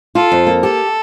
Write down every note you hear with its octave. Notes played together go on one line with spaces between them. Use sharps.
F4 A4
F2
A#3
G4 A4